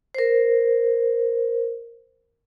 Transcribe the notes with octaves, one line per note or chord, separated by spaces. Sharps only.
A#4 C5